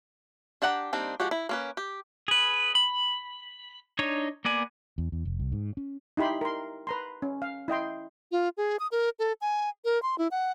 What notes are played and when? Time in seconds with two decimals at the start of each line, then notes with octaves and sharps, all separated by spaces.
0.62 D4 G4 F#5 G5 A#5
0.93 G3 A#3 C4 D4 D#4
1.20 F3 G#3 F#4 G4
1.31 E4
1.49 A#3 C#4 B4
1.77 G4
2.28 G#4 B4
2.75 B5
3.99 D4 D#4 C#5 C#6
4.45 A#3 B3 D5 G#5
4.98 E2
5.12 E2
5.25 F1
5.40 C2
5.52 G#2
5.77 C#4
6.17 D#4 E4 G4 B5 C6
6.41 A#4 C6
6.87 B4 A#5 C6
7.22 C#4
7.42 F5
7.68 E4 D#5 G5 C6
8.32 F4
8.57 G#4
8.79 D#6
8.92 A#4
9.19 A4
9.41 G#5
9.85 A#4
10.03 C6
10.18 E4
10.31 F#5